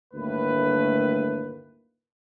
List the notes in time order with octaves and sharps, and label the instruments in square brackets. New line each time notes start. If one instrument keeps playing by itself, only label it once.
[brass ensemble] G1 D2 A2 D#3 A#3 B4